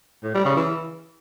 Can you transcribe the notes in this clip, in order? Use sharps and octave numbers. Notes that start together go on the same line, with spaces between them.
A2
G3
C#3
E3